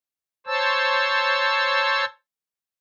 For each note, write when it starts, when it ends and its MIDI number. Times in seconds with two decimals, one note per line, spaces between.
0.46 2.05 72
0.46 2.05 73
0.46 2.05 81
0.46 2.05 88